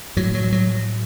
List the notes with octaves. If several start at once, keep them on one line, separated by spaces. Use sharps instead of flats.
A2 F#3
F#3
F#3